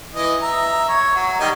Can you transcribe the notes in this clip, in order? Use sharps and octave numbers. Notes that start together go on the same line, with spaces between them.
E3 D#5
E5 A#5
C#5
F#3
D#3 G3 D#4